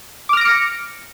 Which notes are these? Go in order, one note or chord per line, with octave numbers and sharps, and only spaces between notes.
D6 F6 A#6 C#7 D7